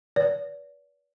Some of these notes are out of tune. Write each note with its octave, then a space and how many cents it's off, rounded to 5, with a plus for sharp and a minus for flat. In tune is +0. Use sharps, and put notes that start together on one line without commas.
B4 -20 D5 -40